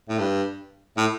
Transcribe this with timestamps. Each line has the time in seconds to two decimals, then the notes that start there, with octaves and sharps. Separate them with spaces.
0.09 A2
0.19 G2
0.97 A2